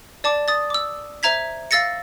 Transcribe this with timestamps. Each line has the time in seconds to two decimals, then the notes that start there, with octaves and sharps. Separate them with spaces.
0.24 D5 A5 D6
0.48 D#6 A6
0.70 D6 E6
1.23 C5 E5 A#5 G#6 B6
1.71 F5 E6 A6 A#6 C#7